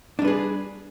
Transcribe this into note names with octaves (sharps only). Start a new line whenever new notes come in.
G3 D4 G#4 B4